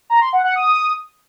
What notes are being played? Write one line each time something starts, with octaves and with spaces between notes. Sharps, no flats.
A#5
C6
F#5
F#5
D#6